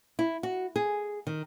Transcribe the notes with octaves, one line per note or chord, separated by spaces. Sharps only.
E4
F#4
G#4
D#3